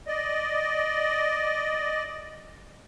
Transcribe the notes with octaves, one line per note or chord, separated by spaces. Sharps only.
D5 D#5